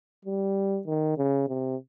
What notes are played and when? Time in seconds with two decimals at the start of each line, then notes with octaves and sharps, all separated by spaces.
0.25 G3
0.87 D#3
1.18 C#3
1.48 C3